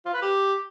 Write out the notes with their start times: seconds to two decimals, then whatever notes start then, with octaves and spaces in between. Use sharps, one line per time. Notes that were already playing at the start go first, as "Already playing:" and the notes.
0.05 F4
0.14 B4
0.22 G4